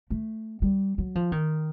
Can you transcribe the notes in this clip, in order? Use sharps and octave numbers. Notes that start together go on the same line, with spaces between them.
A3
G3
F#3
F3
D#3